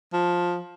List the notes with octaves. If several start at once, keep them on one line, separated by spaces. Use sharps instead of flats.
F3